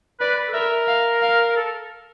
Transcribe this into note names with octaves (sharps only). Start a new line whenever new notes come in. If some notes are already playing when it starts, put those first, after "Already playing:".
B4 D5
B4
A4
A#4 E5
F5
F5
A4